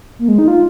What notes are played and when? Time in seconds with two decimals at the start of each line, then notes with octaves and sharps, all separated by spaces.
0.19 A#3
0.28 G#3
0.38 D#4
0.48 F4